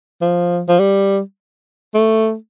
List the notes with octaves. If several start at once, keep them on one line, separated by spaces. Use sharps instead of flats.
F3
F3
G3
A3